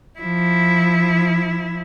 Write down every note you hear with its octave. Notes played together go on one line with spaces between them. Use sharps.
F3 E4